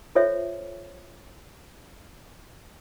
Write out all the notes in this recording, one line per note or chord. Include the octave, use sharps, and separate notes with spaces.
F4 A4 C5 C#5 E5